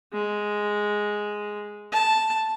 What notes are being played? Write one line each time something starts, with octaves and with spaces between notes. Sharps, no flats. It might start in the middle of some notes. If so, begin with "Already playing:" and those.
G#3
A5